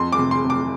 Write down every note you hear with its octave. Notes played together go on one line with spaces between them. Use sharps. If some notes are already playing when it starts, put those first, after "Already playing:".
Already playing: F2 C6
D6
C3
C6
C3
D6